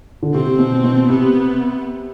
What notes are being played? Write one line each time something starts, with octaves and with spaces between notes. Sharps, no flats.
D3
C3 C4
B2
B2
C3 B3